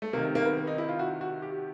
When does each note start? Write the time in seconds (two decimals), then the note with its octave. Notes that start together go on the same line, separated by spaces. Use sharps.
0.02 A3
0.13 C3 D#3 A#3
0.35 A#3
0.46 B3
0.67 D#4
0.78 E4
0.89 F4
0.99 F#4
1.21 F#4
1.42 G4